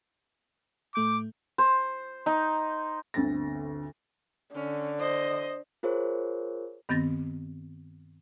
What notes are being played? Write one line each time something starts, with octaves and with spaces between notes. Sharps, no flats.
A2 A3 D6 G6
C5
D#4
G1 D2 D3 C4 A6 A#6
D3 C#4
C5 D#5
F4 G#4 A#4 C5 C#5
G2 D#3 B3 C4 A6 A#6